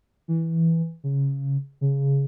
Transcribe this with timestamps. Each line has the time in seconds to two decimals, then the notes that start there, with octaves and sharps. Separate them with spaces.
0.28 E3
1.04 C#3
1.81 C#3